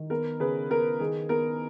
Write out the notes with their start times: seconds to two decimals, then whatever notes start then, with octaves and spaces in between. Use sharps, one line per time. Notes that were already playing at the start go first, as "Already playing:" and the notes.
Already playing: D#3
0.10 B3 A#4
0.40 C#3 G#4 B4
0.70 B3 A#4
0.99 D#3 G#4
1.29 B3 A#4